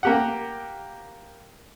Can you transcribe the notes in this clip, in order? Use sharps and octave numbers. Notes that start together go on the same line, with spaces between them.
A#3 G4 F#5